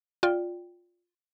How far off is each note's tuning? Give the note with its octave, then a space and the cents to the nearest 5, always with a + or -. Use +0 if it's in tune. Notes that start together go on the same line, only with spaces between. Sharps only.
F4 +10 D5 +0 G5 +0